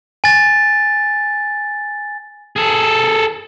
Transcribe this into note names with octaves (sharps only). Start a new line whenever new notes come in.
G#5 A6
G#4 A4